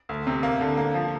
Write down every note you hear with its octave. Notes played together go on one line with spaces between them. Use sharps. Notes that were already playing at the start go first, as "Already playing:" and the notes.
D2
C3
A#3
D3
A#3
F3